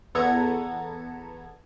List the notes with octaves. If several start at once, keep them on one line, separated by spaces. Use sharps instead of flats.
E2 B3 A4 A#5 G#6 C#7